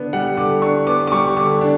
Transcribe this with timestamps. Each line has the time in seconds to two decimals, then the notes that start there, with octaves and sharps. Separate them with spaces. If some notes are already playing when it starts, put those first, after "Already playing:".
Already playing: D3 B3 D4
0.13 G3 F#5
0.37 D3 D6
0.62 D4 C#6
0.87 B3 D6
1.07 D6
1.12 G3 C#6
1.37 D3 D6
1.61 D4